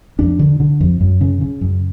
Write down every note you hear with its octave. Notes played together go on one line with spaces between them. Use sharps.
F2 D4
D3
D3
F2
F#2
C#3
C#3
F#2